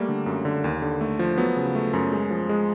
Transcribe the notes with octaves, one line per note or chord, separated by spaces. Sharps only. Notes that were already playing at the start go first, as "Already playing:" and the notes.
Already playing: G3 A3 A#3
D3
F#2
D3
D#2
D3
A3
F3
F#3 B3
C#3
A3
F#2
G#3
F3
G#3